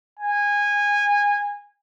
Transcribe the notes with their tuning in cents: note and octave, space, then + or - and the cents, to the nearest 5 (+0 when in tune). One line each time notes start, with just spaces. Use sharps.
G#5 -20